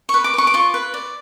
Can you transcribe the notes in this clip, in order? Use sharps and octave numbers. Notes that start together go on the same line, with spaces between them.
B4 C#6
D6
B4 C#6
D6
F4 C#6
B4
D5